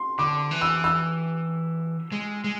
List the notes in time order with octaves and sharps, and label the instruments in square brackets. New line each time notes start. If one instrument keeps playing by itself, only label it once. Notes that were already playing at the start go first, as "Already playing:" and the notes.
Already playing: [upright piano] C6
[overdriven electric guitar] D3 [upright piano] D6
[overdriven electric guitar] E3
[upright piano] E6
E6
[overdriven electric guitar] G#3
G#3